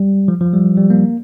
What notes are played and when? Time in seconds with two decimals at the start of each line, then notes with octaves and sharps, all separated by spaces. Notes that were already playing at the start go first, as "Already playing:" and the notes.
Already playing: G3
0.28 F3
0.41 F3
0.53 G3
0.77 G3
0.90 A#3